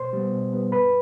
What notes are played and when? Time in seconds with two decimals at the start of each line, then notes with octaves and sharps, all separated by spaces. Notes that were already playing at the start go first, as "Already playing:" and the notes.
Already playing: B2 C5 C6
0.13 G3 B3
0.32 B2
0.52 G3 B3
0.72 G2 B4 B5